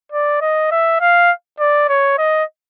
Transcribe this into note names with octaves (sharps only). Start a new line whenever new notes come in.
D5
D#5
E5
F5
D5
C#5
D#5